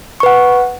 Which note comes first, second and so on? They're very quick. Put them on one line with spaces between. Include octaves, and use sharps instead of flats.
C#6 B4 F#5